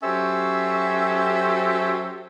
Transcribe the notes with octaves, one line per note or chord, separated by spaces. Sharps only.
F#3 C#4 G4 A4 C5 E5